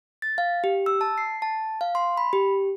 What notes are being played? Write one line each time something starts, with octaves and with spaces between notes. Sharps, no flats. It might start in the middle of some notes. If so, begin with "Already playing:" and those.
A6
F5
G4
E6
A5
C7
A5
F5
C6
B5
G4